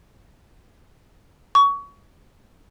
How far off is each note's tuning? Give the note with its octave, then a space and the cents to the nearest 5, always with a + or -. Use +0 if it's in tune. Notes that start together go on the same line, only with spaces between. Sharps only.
C#6 +25